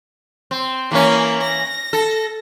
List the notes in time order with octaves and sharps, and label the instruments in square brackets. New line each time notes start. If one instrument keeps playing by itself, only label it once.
[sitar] C4
[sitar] E3 C#4 [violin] A#3
[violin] A#6
[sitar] A4